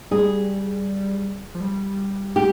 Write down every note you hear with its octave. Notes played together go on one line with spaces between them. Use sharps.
G3 G#4
F3
G3
G4